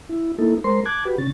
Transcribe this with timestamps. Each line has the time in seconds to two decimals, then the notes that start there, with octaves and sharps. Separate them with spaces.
0.09 E4
0.39 A#3 D#4 E4 A4
0.64 G#3 A#4 C5 C6
0.86 A5 D6 F#6 G#6
1.05 F#4 G4 B4
1.18 C#3 C#4 A6